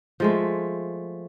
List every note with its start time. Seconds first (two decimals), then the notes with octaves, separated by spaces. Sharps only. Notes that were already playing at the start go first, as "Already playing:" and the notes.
0.20 F3 G#3 A3